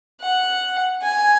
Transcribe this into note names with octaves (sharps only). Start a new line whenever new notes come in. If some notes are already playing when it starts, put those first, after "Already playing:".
F#5
G#5